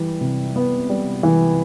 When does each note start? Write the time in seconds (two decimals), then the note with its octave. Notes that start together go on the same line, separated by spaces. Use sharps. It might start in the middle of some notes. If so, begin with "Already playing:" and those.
Already playing: E3 G3
0.21 C3
0.56 B3
0.89 G3
1.23 E3